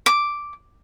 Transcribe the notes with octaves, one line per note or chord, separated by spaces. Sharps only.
D6